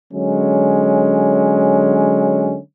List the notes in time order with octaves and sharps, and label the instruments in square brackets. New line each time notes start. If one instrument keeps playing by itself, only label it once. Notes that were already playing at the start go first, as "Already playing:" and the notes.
[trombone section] D3 F#3 G#3 C#4